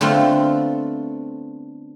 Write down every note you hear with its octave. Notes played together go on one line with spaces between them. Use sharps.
D3 A3 B3 C4 F4